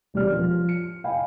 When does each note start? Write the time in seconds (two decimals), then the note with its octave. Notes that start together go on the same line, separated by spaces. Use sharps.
0.14 E1 G3 D5 F6
0.32 F3
0.69 C#7
1.04 D#5 F5 G5 G#5 B5